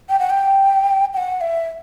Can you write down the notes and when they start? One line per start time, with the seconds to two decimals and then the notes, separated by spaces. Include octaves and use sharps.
0.09 G5
0.20 F#5
0.30 G5
1.13 G5
1.17 F#5
1.41 E5